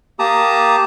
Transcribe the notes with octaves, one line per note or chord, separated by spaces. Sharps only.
A#3 G4 A5 A#5 D#6